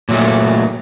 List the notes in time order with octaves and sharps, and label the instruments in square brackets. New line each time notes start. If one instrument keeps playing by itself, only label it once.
[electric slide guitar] A#2 F#3 A3